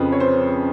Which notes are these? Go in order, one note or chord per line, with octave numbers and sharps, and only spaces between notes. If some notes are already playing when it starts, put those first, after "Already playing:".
Already playing: F2 C#3 F3 B4
C#5
C5